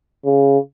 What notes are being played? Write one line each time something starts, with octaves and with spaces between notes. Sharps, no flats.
C#3